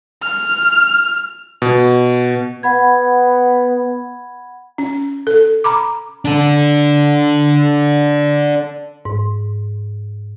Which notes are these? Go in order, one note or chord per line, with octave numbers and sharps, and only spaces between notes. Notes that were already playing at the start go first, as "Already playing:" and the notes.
F6
B2
B3 F#5 B5 G#6
C#4
A4
A#5 B5 D6
D4 A4
G#2